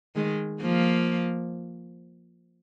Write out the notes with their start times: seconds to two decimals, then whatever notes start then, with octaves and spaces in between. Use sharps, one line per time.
0.15 D#3 G#3
0.61 F3 A#3